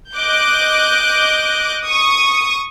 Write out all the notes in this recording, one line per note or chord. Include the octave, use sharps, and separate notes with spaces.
D#5 D6 F#6 G6
C#6 D#6